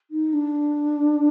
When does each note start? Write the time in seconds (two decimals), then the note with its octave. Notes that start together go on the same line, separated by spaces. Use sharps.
0.11 D#4
0.33 D4